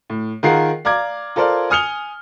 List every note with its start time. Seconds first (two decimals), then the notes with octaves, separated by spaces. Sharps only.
0.10 A2
0.43 D#3 F4 G#4 A#4 F#5 C7
0.85 D5 F5 A#5 D6 G#6
1.36 F4 A4 A#4 C5 D5 F5
1.70 G#5 D#6 F6 C#7 F7 G7